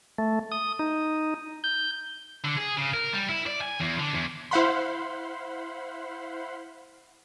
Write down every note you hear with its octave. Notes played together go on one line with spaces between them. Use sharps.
A3
D#6
D#4
G6
D3
G#4
C#3
A#4
G3
E4
D5
G#5
E2
D3
E2
E4 C5 F5 F#5 B5 C6